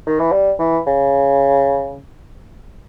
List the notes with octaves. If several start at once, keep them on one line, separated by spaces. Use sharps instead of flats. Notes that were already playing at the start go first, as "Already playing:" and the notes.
D#3
E3
G3
E3
C#3